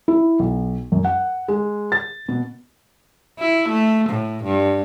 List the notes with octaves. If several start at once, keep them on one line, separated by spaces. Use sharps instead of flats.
E4
B1
F#2
F#5
G#3
A6
B2
E4
A3
A2
G2